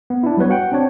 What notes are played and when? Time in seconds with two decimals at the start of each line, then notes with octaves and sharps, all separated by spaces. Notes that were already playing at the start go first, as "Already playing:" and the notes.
0.10 B3
0.23 D4 E4
0.37 F#3 G3 B3 B4 C#5
0.50 F#4 F#5 G5
0.72 C4 D4 C#5